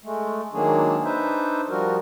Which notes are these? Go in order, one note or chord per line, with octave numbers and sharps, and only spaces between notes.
G#3 A3
D#3 F#3 G#3 A#3 D4 G#4
D4 D#4 B4 C5 E5
F3 G3 F#4 A#4